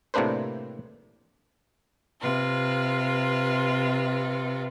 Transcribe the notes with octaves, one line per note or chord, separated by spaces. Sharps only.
A2 C3 A#3 D4 B4 C5
C3 F4 B4